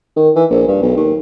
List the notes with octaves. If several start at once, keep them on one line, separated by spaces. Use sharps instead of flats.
D#3
E3
A#1
G2
B1
D#2